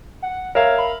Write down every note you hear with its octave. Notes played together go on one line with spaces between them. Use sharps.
F#5
A#4 C#5 E5 F5
B5